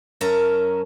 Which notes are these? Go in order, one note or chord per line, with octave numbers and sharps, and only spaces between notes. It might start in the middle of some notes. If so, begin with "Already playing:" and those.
F#2 C#4 A#4 E5 A5 A#5